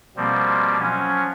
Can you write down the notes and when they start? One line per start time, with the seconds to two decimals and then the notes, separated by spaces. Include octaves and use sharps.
0.17 B2 F3 G3 A#3 C4
0.79 F3 F#3 C#4